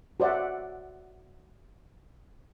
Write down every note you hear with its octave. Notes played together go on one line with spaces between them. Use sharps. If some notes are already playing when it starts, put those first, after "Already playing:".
F#4 C5 D5 E5 F#5